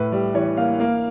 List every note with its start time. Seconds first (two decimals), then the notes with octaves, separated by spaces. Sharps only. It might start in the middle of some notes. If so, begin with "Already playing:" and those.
Already playing: A2 B4
0.12 G3
0.34 E3 C#5
0.57 A#3 F5
0.80 A#3